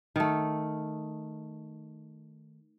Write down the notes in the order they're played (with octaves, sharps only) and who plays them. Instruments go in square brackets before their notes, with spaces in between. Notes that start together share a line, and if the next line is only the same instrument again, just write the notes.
[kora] D#3 A3